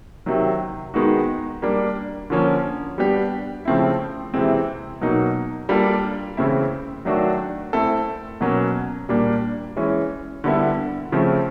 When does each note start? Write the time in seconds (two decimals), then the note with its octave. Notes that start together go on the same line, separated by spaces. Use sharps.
0.26 C3 D#3 F#3
0.94 D#3 G#3 B3 D#4 F#4
1.62 G3 A#3 D4
2.30 D3 F3 A#3 C#4
2.98 G3 B3 D4 G4
3.65 C#3 F3 A3 C4 E4
4.34 C3 E3 G#3 C4
5.01 B2 F#3 A#3 D#4
5.69 G3 A#3 D4 F4 A4
6.37 C#3 E3 A3 C4 E4
7.05 D#3 F#3 A3 D4 F#4
7.73 A3 C4 E4 A4
8.41 B2 F#3 A#3 C#4
9.09 A#2 G3 A#3 D4
9.77 E3 G#3 C#4
10.44 D3 G3 B3 E4 A4
11.12 C#3 F3 A3 C4